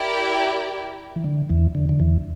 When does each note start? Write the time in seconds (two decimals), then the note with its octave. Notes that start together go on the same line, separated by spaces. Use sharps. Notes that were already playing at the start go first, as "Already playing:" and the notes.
Already playing: E4 G4 A#4 D5 G5
1.16 E3
1.24 D3
1.49 E2 E3
1.75 D3
1.89 D3
2.00 E2 E3